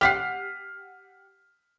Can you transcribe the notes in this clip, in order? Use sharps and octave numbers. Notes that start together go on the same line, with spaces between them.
G4 F#5 F6 B6 C7